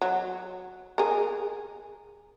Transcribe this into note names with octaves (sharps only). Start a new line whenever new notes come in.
F#3
G#4 A#4